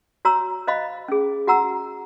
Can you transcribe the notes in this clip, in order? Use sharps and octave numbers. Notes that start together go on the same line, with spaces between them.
F#4 C#5 A#5 E6
C5 D#5 F5 B5
C#4 G#4
F#4 F#5 A#5 E6